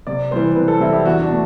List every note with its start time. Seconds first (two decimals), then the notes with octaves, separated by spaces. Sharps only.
0.07 C3 D5
0.31 E3 G3 C4 C5
0.56 C3 B4
0.68 A4
0.80 E3 G3 C4 E4
0.93 G4
1.05 E2 F#4
1.21 D4
1.30 B2 A3